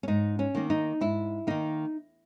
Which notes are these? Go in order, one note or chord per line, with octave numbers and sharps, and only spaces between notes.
C#4
G#2 D#4
C#4
D#3 A#3
D#4
G#2 E4
D#3 A#3 D#4